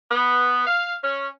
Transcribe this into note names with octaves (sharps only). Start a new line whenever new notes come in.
B3
F5
C#4